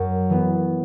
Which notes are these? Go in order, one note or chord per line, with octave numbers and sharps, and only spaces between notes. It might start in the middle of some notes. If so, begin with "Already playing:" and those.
Already playing: F#2
E3 B3